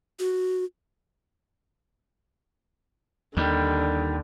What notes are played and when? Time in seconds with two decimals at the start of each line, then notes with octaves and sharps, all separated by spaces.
0.19 F#4
3.37 D#2 D3 D#3 G3